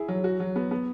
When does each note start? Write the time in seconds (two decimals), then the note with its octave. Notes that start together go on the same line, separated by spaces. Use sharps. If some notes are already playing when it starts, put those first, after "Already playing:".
Already playing: E4 G#4
0.08 F#3
0.24 F#4
0.40 F#3
0.56 B3
0.71 B3